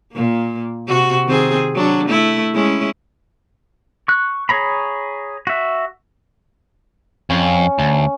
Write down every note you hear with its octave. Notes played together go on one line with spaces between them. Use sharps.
A#2 A#3
C3 F#4
D#3 C4 G#4
F#3 D4
A3 E4
G#3 C#4 E4
C#6 F#6
G#4 C#5 A#5 B5
F#4 E5
F2 C#4
D2